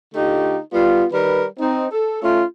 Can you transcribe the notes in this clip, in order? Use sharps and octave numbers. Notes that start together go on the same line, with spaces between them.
D3 A3 D#4 F4 G4
G3 B3 F4
D#3 G3 A#4 B4
C4 D#4
A4
A3 C#4 F4